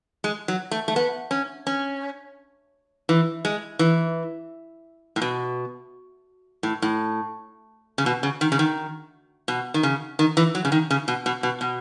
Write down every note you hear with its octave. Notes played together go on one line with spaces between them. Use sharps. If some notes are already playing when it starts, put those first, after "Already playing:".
G#3
F#3
A3
A3
B3
C#4
C#4
E3
G#3
E3
A2
B2
A2
A2
C#3
B2
C#3
D#3
C#3
D#3
B2
D#3
C#3
D#3
E3
F#3
C#3
D#3
C#3
B2
B2
B2
B2